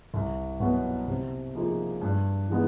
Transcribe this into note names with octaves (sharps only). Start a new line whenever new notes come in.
C2
B2 F#3 B3
C3
F3 A#3 D#4 G#4
G2
E3 G#3 B3 D#4